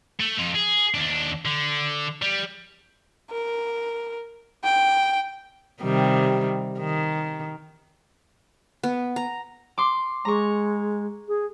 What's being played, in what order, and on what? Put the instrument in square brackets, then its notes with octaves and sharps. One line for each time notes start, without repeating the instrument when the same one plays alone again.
[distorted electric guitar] A3
F2 F4
G#4
D#2 D4
D3
G3
[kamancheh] A#4
G5
[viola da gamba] C3 D#3 G3
D#3
[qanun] B3
A#5
[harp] C6 D6
[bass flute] G#3 [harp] A#5 C#6
[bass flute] G#4